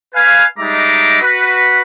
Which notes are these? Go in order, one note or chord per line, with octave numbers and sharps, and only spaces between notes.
B4 F5 G#5
G3 G#3 D#4 E5 A#5 D6
F#4 B4